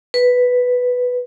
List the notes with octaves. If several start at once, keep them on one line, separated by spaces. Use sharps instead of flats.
B4